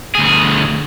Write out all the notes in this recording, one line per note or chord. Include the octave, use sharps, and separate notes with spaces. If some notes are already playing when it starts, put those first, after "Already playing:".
D2 G#4